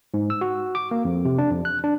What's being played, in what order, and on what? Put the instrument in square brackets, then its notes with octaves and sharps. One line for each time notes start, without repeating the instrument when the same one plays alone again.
[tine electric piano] G#2
E6
F#4
D6
A#3
F2
C3
D4
F2
F#6
D4